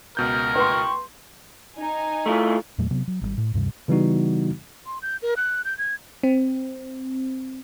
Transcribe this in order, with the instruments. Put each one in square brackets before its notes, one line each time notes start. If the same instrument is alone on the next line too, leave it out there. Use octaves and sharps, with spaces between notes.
[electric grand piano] C#2 B2 G6 [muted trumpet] A#4
[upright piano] B4 C6 [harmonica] G5 C#6
[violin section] D#4 G#5
[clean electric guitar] A3 E4 F4
[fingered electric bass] E2 A#2 F#3 A3
C3 F#3 B3
F#3
G#1 D3 G3
A2
D2 G2 C3 G3
[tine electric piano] C#3 E3 G3 B3 D#4 F#4
[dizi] C6
G6
A#4
F#6
G6
G#6
[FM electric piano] C4